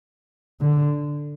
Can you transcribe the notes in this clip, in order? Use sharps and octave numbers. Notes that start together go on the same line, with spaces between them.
D3